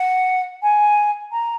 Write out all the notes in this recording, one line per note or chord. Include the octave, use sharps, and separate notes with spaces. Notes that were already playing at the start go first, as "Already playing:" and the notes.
Already playing: F#5
G#5
A#5